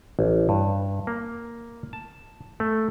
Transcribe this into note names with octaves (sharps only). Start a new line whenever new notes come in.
A1
G2
A#3
A5
A3